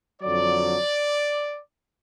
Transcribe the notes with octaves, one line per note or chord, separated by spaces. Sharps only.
F2 D3 F#3 D5